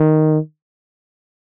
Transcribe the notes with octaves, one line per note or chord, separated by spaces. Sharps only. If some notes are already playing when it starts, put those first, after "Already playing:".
Already playing: D#3